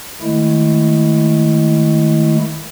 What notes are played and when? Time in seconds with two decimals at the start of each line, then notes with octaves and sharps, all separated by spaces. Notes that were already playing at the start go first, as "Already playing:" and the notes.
0.22 D#3 G#3 A3 E4